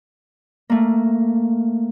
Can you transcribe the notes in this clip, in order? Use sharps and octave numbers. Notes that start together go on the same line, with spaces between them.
A3 A#3